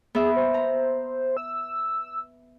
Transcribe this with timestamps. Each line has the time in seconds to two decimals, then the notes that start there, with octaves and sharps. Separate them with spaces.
0.15 B3 G#4 E5
0.36 C5
0.54 A#5
1.37 E6